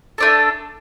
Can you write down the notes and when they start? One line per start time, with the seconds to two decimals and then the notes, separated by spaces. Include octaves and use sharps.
0.18 A3 D4 A4